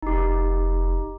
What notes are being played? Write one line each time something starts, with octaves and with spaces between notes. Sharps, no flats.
F1 D#4 G4